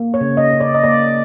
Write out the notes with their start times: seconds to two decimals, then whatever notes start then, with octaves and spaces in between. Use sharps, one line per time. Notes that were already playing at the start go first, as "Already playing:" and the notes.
Already playing: A#3
0.14 C#5
0.21 C#3
0.37 D#5
0.53 C#3
0.61 D5
0.74 D#5
0.84 A#3 D5